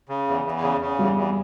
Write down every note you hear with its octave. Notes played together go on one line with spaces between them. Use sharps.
C#3
E2
E2
C#3
C#3
E2 G3
E2